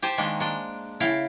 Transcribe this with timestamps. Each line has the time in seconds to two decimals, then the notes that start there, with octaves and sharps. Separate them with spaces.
0.02 G4 C5 G#5 A5
0.18 D#3 G#3 A#3 D4
0.40 G#3 D4
1.00 C#3 E4 F5 G5